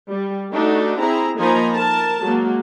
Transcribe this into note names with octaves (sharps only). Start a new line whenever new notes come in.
G3
A3 D4 D#4 F#4
C4 E4 G#4 A#5
F3 A#3 D#4 G#5 A#5 B5
A#4 A5
F#3 G#3 A#3